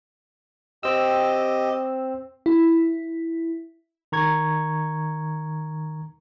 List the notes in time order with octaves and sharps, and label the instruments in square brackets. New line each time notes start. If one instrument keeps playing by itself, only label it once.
[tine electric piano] C4 E6 [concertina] G4 D#5
[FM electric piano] E4
[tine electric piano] D#3 A#5 C#6 G#6